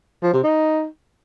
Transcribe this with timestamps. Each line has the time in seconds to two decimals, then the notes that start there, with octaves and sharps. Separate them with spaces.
0.23 F3
0.33 C3
0.44 D#4